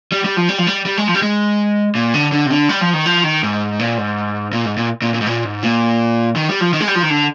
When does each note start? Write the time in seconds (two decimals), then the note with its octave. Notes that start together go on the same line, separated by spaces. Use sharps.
0.12 G3
0.24 G3
0.36 F3
0.49 G3
0.58 F3
0.67 G3
0.86 G3
0.97 G#3
1.08 F3
1.14 G3
1.22 G#3
1.95 A#2
2.14 D3
2.32 D3
2.46 C3
2.50 D3
2.69 G3
2.81 F3
2.93 D#3
3.06 F3
3.24 D#3
3.43 G#2
3.79 A#2
3.98 G#2
4.53 A#2
4.65 G#2
4.77 A#2
5.02 A#2
5.14 A#2
5.21 G#2
5.26 A#2
5.45 G#2
5.63 A#2
6.36 D#3
6.49 G3
6.61 F3
6.73 D#3
6.80 G#3
6.88 G3
6.95 F3
7.03 D#3
7.10 D3